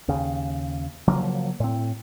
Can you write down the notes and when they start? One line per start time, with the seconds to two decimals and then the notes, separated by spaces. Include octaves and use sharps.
0.08 D#2 C#3
1.08 C#3 F3 F#3 A#3
1.60 A2 C4